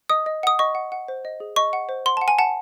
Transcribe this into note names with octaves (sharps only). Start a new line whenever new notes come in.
D#5 D#6
D#5
F#5 D#6
D#5 C#6
F#5
F#5
C5
D#5
G#4
D#5 C#6
F#5
C5
F#5 C6
F#5 A5
G#5
F#5 A5